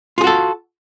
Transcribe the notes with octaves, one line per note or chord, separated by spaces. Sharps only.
F4 F#4 G#4 A4